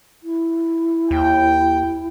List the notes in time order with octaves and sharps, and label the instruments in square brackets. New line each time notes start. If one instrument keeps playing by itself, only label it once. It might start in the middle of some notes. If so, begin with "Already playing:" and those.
[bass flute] E4
[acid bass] D#2 [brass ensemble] G5